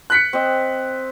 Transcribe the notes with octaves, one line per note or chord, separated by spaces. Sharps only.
F#6 B6 C#7
C4 D#5